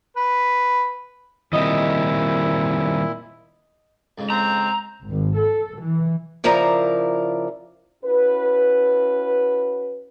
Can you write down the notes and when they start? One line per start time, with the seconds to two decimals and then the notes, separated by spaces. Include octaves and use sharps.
0.17 B4
1.53 A#2 D#3 G3 C4 E4 D#5
4.18 F2 G#2 C#3
4.30 C4 A#5
5.07 G#1
5.38 A4
5.80 E3
6.44 C#3 F3 E4 A#4 D5 A#5
8.04 C#4 E4 F#4 B4